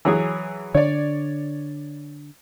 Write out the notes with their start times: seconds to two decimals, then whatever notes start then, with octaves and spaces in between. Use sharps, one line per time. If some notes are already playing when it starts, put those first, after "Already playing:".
0.05 E3 F#3 G#4
0.74 D3 D4 C#5 D5